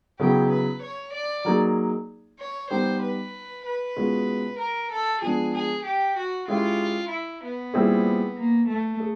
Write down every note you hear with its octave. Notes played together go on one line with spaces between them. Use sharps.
C#3 F#3 B3 E4 G4 G#4
B4
C#5
D5
F#3 A#3 D#4 G#4
C#5
G3 B3 D#4 G4 C5
B4
B4
B2 G#3 C#4 F4 G#4
A#4
A4
F3 G#3 B3 D4 G#4
G#4
G4
F#4
G#3 C#4 E4 F4 G4
E4
B3
A#2 G3 C4 E4 G#4
A#3
A3
G#4